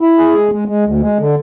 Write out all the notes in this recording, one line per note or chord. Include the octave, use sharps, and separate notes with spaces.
E4
G#4
G#3
G#3
G#3
D2
G#3
D3